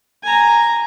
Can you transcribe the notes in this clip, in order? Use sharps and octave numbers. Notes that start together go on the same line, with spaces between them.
G#5 A#5